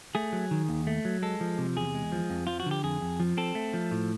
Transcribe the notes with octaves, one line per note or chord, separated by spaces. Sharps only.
A3 G#4
F#3
D#3
D#2
A3
F#3
G#3 A4
F3
C3
E2 G#4
G#3
F3
F2
F3 F4
F#4
D3
G4
F2 G#4
F2
F3
C4 A4
A3
F3
A2